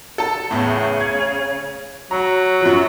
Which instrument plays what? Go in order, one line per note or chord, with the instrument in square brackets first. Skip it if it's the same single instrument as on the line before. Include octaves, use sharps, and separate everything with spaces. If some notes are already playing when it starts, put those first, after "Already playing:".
[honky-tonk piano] A4 A5
[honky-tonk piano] E2 A2 [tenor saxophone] C#3
[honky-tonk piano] G#6
[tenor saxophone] F#3 [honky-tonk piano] A#5
[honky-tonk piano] F#2 F3